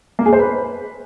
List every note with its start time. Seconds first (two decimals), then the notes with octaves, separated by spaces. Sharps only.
0.19 A#3
0.26 G#4
0.33 C5
0.40 B4